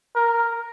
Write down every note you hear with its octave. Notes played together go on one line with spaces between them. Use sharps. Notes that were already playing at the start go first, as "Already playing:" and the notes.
A#4